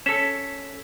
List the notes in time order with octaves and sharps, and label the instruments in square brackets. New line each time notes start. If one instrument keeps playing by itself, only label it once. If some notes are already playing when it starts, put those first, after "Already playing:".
[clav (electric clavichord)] C#4 A4 [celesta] B6 E7